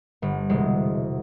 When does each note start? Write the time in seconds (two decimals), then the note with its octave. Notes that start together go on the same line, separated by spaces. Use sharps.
0.22 G1
0.49 E1 C3 G#3